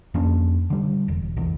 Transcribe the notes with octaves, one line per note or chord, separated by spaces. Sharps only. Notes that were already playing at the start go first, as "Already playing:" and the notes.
F2 A#3 C#4 D4
D3 G3
E1
F1 B1 E2